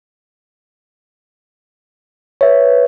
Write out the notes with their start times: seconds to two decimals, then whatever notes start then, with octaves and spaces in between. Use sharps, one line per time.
2.41 B4 C#5 E5